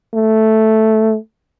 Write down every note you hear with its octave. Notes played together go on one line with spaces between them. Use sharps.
A3